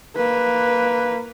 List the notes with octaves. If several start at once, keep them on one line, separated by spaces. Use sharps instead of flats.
A#3 B4